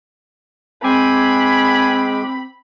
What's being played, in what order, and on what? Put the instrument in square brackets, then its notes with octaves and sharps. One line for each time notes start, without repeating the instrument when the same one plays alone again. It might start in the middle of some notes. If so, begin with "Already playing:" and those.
[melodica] G#3 D6 [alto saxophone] C4 [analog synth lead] G#5 [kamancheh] B5